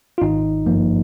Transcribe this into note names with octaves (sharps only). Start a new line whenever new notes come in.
F4
G#1 D#4
G2 F3 A#3